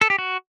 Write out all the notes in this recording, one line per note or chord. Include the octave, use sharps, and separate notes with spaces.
A4
G4
F#4